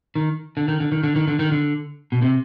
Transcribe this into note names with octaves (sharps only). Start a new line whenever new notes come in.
D#3
D3
D#3
D3
D#3
D3
D#3
D3
D#3
D3
B2
C3